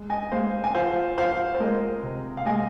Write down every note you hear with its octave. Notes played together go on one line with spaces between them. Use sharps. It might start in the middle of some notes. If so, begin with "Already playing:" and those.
Already playing: G#3
D#5 G#5
G#3 C5 F5
G#5
F3 C5 F5
F3 C5 F5
C5
G#3 A#4 D#5
C3
F5
G#3 D#5 G#5